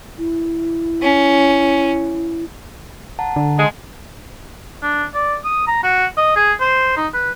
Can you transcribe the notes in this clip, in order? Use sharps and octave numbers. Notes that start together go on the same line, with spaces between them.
E4
C#4
F#5 A5 A#5
D3
G#3
D4
D5
D#6
A#5
F#4
D#5
G#4
C5
D#4
B4